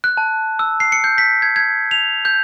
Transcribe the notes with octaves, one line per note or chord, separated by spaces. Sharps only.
F#6
A5
E6
C7
C#7
G6
B6
G#6
G#6
F7
G6